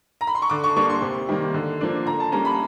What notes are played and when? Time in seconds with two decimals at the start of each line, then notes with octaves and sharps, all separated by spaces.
0.21 A#5
0.27 B5
0.35 C6
0.42 C#6
0.49 D3 D6
0.64 C#6
0.76 G3 A#3 D4 C#6
0.89 C6
1.01 C3
1.29 D#3 G3 A#3
1.54 D3
1.81 F3 A#3 D4
2.06 D3 A#5
2.20 A5
2.32 G3 A#3 C#4 A#5
2.45 B5